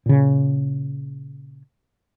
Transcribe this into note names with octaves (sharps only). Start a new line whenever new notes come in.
A#2 C#3